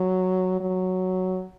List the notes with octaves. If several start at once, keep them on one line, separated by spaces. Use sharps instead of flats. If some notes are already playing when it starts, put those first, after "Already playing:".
Already playing: F#3
F#3